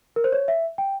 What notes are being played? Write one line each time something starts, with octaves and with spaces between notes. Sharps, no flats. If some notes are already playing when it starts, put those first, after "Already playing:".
A#4
C5
C#5
E5
G5